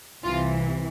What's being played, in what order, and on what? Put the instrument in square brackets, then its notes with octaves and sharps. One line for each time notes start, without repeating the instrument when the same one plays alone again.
[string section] C2 C3 E3 F4